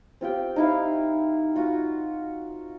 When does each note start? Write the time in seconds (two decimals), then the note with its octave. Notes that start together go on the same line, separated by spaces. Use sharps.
0.21 C4 F4 G4 G5
0.56 D#4 E4 F5
1.56 F4 F#4